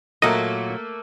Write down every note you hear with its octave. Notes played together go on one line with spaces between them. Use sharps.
A#2 F#3 A3 A#3 D#5